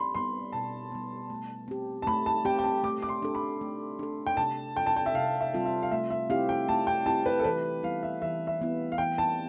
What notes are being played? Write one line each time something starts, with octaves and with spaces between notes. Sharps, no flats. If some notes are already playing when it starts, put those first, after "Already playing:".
Already playing: B5 C6
G3 B3 C6
B2 A5
G3 B3
A3
C4 G4
A5
A3 B5
A5
C4 G4 G5
G5
A5
A3 D6
D6
C6
D4 A4
B5
A3
D4 A4
G5
C3 A5
G3 C4 F4 A4 G5
A5
G5
E5
C3 F5
E5
G3 C4 F4 A4
E5
F5
A3 E5
E5
C4 E4 G4 F5
G5
A3 A5
G5
C4 E4 G4 A5
B4
A4
E3 B4
G3 B3 E4 F5
E5
E3 E5
E5
G3 B3 E4
F5
E3 G5
A5